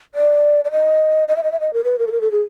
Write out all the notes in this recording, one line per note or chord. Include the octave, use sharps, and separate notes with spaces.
D5
D5
D#5
D#5
E5
D#5
E5
D#5
A#4
B4
A#4
A4
A#4
A4
G#4